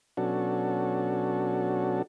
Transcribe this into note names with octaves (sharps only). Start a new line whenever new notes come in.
B2 F#3 C#4 D4 F#4 A4